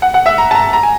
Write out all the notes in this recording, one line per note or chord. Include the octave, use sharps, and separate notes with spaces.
F#5
F#5
E5
A#5
A5
A#5
A#5
G#5